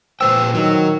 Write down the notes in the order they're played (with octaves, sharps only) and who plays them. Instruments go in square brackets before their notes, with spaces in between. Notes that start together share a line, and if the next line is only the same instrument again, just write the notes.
[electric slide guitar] A#2 B4 G5 [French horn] C5 [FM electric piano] E6
[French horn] D#3 [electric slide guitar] F#3